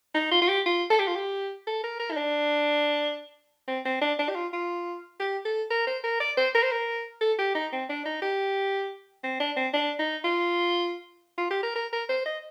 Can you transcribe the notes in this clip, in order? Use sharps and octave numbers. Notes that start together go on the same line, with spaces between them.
D#4
F4
F4
G4
F4
A4
G4
F4
G4
A4
A#4
A#4
D#4
D4
C4
C4
D4
D4
G4
F4
F4
G4
A4
A#4
C5
A#4
D5
C5
A#4
C5
A#4
A4
G4
D#4
C4
D4
D#4
G4
C4
D4
C4
D4
D#4
F4
F4
G4
A#4
A#4
A#4
C5
D#5